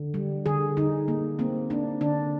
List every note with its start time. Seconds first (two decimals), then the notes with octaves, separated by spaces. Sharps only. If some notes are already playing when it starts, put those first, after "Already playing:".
Already playing: D3
0.14 G3
0.46 D3 G#4
0.77 D3 D#4
1.08 A#3
1.39 A#3 C4
1.70 A#3 D4
2.01 D3 D4